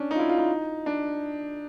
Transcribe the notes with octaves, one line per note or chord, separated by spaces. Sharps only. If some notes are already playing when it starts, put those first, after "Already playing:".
Already playing: C#4 D4
D#4 F4
E4
F4
D#4
D4